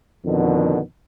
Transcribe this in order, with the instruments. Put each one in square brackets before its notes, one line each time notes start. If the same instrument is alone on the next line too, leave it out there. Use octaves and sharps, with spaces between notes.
[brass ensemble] F2 B2 D3 D#3